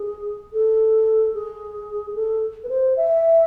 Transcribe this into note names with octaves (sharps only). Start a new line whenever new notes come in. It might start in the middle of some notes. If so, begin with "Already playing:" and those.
Already playing: G#4
A4
G#4
A4
B4
C5
E5